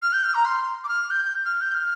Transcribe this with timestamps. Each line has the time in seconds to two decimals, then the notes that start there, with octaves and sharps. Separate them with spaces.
0.02 F6
0.13 G6
0.24 F6
0.34 A#5
0.45 C6
0.84 D6
0.89 F6
1.10 G6
1.45 F6
1.61 G6
1.74 F6